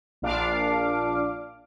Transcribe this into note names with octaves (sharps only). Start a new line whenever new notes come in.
A#1 A#2 D4 F5 D6